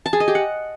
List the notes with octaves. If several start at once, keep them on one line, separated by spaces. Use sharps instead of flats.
A5
G#4
D#5
G4
F#5